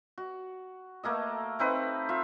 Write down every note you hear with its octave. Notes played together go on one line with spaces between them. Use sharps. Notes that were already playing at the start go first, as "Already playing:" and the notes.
F#4
A3 A#3 A4 D#5
A3 C4 D#4 B4
F4 E5